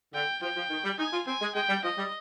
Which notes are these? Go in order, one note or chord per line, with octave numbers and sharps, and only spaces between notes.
D3 G5
F3 G5
F3
D#3
G3
D#4 G#5
F4
C4 G#5
G#3
G#3 G5
G3
F3 D#5
G3